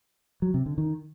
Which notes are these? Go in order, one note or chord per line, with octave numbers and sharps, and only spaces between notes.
F#3
C3
D3
D#3